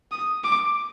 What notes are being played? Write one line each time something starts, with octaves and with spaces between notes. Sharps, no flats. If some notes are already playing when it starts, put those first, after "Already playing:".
D#6
D6